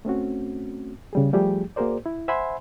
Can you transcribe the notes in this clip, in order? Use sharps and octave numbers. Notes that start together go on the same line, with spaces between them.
A3 C4 C#4 F#4
C#3 G3 G#4
F3 G3 A3 G4 G#4
A#3 F#4 G#4 A#4 C5 D5
E4
C5 E5 F#5 G#5 B5 C6